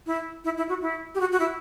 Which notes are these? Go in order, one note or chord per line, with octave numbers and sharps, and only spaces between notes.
E4
E4
E4
F#4
E4
G4
F#4
F#4
E4